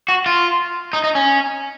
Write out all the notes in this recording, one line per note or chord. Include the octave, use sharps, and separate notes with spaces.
F#4
F4
D#4
D#4
C#4